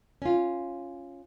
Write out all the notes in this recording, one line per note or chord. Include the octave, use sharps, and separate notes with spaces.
C#4 F4